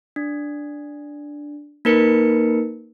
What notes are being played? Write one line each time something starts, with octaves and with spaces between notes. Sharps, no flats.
D4
A#3 D#4 A#4 B4 C#7